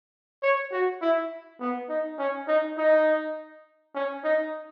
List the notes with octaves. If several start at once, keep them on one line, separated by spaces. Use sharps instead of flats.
C#5
F#4
E4
B3
D#4
C#4
D#4
D#4
C#4
D#4